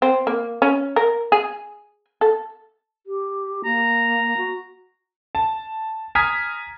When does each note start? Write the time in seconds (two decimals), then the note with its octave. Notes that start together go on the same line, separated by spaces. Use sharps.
0.02 C4
0.27 A#3
0.62 C#4
0.96 A#4
1.32 G#4
2.21 A4
3.07 G4
3.65 A#3 A#5
4.37 F#4
5.35 A5
6.15 G#5 A#5 D#6 F6 G#6 B6